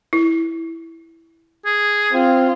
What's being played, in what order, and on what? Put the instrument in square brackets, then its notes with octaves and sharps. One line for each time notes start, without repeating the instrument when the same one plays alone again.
[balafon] E4
[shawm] G#4
[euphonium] C4 [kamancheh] F4